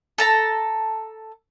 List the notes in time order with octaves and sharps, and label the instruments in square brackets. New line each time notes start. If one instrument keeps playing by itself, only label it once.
[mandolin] A4 A5 A#5